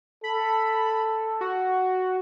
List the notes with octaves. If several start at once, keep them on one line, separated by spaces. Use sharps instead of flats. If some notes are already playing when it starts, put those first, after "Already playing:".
A4 B5
F#4